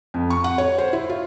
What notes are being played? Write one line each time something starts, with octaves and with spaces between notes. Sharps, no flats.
F2
C#6
F#5
C#5
C5
E4
F4